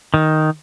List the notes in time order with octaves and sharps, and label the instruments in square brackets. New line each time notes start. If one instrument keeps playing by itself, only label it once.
[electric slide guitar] D#3